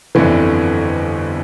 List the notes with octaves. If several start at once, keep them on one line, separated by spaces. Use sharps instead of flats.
G1 F2 D3 E3